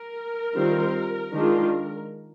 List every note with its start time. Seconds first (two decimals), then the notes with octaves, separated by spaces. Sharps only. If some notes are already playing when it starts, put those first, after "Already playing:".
Already playing: A#4
0.55 D#3 G3 C4 F4
1.34 D#3 G#3 D4 F4